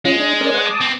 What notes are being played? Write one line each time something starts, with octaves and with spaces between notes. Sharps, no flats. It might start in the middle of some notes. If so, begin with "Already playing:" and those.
G#3 C#4 F4
D4
C#4 A#4 D5
B4 C#5 F#5
A5 D6 D#6
B3 C4